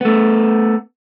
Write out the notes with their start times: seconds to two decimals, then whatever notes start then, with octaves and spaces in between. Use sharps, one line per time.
0.01 A3 B3